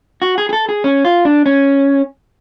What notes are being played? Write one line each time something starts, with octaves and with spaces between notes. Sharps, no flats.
F#4
G#4
G#4
A4
G#4
C#4
F4
D4
C#4